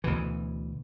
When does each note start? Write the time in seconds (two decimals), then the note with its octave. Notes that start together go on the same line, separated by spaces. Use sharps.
0.04 D2 B2 E3